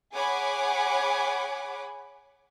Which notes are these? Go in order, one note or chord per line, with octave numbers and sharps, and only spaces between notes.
G#4 C#5 F#5 G#5 B5 D6